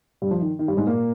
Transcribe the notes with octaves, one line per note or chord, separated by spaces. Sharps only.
G2 G3
F3
D#3
D#3
G2 G3
G#2 G#3
A#2 A#3